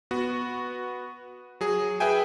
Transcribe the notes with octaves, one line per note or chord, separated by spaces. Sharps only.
B3 F#4
F#3 G#4
G#4 B4 E5 G5 G#5